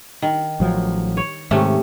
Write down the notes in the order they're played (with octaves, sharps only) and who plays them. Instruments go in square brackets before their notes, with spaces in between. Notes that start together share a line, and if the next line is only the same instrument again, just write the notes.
[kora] D#3
[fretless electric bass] A1 F3 F#3
[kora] C#5
[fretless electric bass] G#2 D#3 [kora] C3 A3 C#4